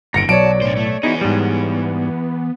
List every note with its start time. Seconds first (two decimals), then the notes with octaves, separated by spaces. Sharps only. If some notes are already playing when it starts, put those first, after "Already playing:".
0.14 G1 A#2 D#3 A#5 A#6 C#7 D7
0.29 B1 F#3 C#5 D5 A5 D7
0.62 A2 D4 C5
0.77 A3
1.03 E3 B3 D#4 E4 F#4 G#4
1.21 G#2 G3